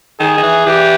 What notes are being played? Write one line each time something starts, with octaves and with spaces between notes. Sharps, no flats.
D#3 G#4
D#3
E3
E3 G4